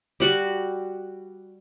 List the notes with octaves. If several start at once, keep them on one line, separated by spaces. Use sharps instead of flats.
G3 F#4